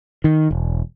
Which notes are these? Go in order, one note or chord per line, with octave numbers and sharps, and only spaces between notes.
D#3
E1